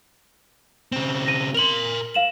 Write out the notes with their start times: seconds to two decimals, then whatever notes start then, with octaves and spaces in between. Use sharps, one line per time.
0.92 C#3 C4
1.26 A#6 D#7
1.54 A#4 C6 F7 F#7
2.14 F5 E7 F#7